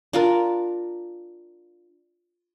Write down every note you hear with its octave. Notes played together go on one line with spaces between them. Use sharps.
D4 F4 A#4